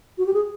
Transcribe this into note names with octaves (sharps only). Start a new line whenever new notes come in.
F#4
G4
G#4